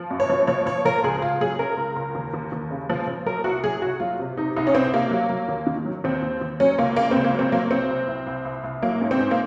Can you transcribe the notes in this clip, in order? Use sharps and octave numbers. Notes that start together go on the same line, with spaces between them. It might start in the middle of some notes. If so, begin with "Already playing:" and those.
Already playing: F3
F#2
C#5
F3
F3 C#5
F3 C#5
F3 A#4
C#2 G#4
C#2 F4
F#3 G#4
C#3 A#4
C#2
C#2
D#2
D#2
D#2
C#3
F3
F3
F#3 A#4
C2 F#4
F#3 G#4
C2 F#4
F#3 F4
C3
C3 D#4
C2 D#4
C#4
C2 C4
C3 A#3
F#3
F#3
D#2
D#3
F#3
D#2 C4
D#2
D#2
F#3 C#4
C#2 A#3
C#3 A#3
C#2 C4
A#3
F#3 C4
F#3 A#3
C2 C4
C2
C2
C2
C2
C2
F#3 A#3
G#2
C4
G#2
A#3